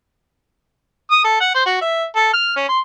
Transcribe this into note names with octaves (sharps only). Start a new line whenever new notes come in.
D#6
A4
F#5
C5
F#4
E5
A4
F6
C#4
C6